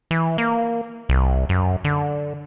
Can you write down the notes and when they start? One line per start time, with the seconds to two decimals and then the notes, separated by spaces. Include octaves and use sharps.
0.11 E3
0.38 A#3
1.09 C2
1.49 F#2
1.84 D3